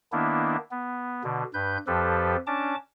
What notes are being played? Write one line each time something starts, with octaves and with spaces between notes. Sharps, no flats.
D#3 A#3 B3 D4 E4
B3
B2 D3
G2 B4 G6
F2 F3 G4 A4 B4
C#4 D4 A5 D6